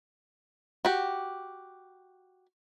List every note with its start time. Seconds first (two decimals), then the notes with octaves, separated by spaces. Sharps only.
0.85 F#4 G4